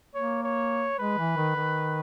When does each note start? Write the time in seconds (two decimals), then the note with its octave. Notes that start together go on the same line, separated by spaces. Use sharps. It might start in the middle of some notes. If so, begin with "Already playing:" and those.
0.15 A#3 C#5
0.43 C#5
0.99 G#3 B4
1.18 E3
1.37 D#3
1.56 D#3